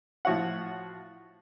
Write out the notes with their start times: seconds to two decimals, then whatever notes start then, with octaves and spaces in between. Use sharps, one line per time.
0.25 A2 F3 F#4 C#5 F#5